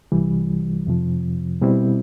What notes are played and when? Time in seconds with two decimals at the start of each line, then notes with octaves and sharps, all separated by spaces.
0.12 C2 C3 E3 G3
0.87 F2 C3 F3
1.61 B2 G3 C4 E4